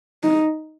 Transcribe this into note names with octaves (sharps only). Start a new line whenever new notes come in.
D#4